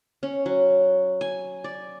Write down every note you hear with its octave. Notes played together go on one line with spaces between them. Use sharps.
C#4
F#3
G#5
D5